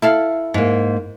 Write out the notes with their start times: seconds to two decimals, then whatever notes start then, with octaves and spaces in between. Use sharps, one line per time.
0.02 E4 A4 F5
0.54 G#2 A#3